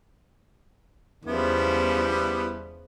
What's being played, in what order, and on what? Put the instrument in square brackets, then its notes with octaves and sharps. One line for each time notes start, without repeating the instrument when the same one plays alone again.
[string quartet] E2 C#3 F3 [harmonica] G3 B3 E4